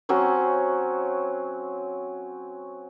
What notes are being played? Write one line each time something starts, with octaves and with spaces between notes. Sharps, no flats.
F#3 C4 C#4 C5